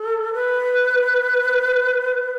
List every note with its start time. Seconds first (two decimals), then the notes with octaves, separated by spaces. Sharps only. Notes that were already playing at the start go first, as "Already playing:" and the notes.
Already playing: A4
0.33 B4